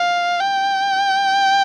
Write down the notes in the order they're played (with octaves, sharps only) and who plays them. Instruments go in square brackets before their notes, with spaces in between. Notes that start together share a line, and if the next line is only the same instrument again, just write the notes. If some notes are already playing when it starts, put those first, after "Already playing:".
Already playing: [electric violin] F5
G5